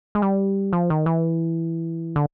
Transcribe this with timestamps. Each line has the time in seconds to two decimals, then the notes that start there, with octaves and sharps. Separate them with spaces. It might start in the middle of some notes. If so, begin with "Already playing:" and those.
0.15 G#3
0.22 G3
0.73 F3
0.90 D#3
1.06 E3
2.16 D3